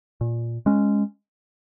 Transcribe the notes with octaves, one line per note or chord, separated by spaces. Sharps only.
A#2
G#3 C#4